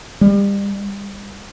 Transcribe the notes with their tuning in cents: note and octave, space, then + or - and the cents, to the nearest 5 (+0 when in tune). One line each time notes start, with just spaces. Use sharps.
G3 +35